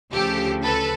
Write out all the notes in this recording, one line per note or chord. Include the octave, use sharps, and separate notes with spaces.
D2 C#3 F3 G4 A4
A4 B4